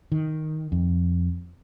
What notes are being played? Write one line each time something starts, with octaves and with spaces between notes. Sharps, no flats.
D#3
F2